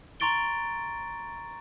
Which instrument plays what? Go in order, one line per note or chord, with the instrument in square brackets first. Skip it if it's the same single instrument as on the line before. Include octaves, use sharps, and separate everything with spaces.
[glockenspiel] A#5 C6 C#6 A6 D7 G7